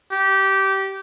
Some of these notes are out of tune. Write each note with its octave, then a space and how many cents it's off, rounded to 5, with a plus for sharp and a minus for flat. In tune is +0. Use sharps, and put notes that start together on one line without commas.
G4 -20